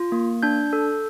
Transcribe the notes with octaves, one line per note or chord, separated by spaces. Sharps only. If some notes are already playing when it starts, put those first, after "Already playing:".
Already playing: F4
A#3
D4 G6
A4